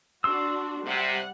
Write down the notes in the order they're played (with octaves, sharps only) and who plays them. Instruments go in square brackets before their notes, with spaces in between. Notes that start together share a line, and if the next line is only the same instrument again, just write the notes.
[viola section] D4 F#4 [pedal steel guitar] C6 E6
[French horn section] C3 [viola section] G3 F#5